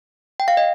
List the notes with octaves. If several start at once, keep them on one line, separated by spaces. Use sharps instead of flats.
G5
F5
D#5